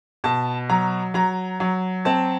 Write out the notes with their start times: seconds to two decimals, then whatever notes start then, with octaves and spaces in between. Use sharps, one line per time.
0.24 B2 A5
0.69 F#3 A#5
1.14 F#3 A#5
1.60 F#3
2.05 C4 A5